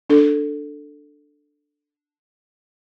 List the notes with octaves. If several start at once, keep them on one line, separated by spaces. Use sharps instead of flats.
D4 A4